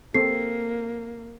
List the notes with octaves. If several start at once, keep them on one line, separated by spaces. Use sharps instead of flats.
A#3 C4 A4 C7